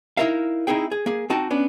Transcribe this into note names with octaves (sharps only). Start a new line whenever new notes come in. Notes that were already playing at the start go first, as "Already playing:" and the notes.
D#4 E4 G4 A#4 E5 F5
C4 D#4 E4 G#4 G5
G#4
A#3 G#4
C4 D#4 F#4 G5 A5
B3 C#4 D4